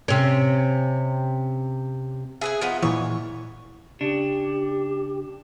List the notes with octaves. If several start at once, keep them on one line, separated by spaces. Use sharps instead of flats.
C3 C#4
G#4 B4 E5 G#5
F3 B3 D#4
A#2 E3 C#5
C#3 D4 G4